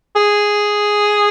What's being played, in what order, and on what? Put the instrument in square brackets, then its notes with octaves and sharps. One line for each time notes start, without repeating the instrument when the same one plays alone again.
[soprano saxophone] G#4